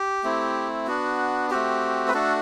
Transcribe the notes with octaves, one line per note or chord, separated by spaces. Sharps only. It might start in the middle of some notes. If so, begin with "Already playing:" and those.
Already playing: G4
A3 C4 E4
B3 D4 F#4
A3 C4 F#4 G4
B4
A3 D4 F#4 A4